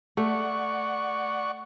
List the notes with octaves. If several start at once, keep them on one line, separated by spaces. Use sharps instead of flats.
A3 D5 F#5 C#6